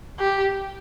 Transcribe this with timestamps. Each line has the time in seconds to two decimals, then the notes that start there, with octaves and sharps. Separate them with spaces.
0.19 G4